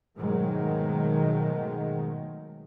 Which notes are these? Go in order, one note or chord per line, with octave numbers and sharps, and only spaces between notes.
G#2 B2 D#3 F#3 G#3 A3